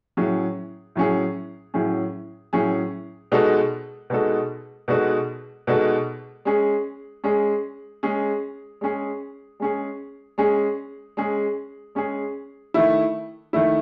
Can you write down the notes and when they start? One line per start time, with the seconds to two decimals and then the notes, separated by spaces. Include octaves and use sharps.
0.17 A2 F#3 C#4 G#4
0.95 A2 F#3 C#4 G#4
1.74 A2 F#3 C#4 G#4
2.53 A2 F#3 C#4 G#4
3.32 B2 G#3 D#4 F#4 A4
4.10 B2 G#3 D#4 F#4 A4
4.88 B2 G#3 D#4 F#4 A4
5.67 B2 G#3 D#4 F#4 A4
6.45 G#3 C#4 G#4
7.24 G#3 C#4 G#4
8.03 G#3 C#4 G#4
8.81 G#3 C#4 G#4
9.60 G#3 C#4 G#4
10.38 G#3 C#4 G#4
11.17 G#3 C#4 G#4
11.95 G#3 C#4 G#4
12.74 D#3 A3 E4
13.53 D#3 A3 E4